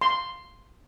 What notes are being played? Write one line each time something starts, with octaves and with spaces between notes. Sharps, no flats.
C6